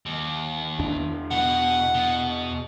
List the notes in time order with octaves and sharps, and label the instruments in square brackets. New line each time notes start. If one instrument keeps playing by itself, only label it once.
[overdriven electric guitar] D#2
[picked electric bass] E2 D4
[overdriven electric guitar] B2 [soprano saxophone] F#5
[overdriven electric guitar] B2